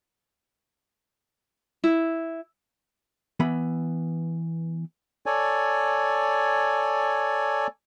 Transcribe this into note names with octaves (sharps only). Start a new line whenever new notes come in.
E4
E3 B3 B5
A4 C#5 D5 G#5